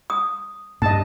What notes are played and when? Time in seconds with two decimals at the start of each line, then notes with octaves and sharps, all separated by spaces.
0.10 D#6
0.82 G2 D#5 A5